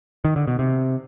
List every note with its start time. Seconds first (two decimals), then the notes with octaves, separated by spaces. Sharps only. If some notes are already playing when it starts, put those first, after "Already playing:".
0.25 D#3
0.36 D3
0.48 B2
0.59 C3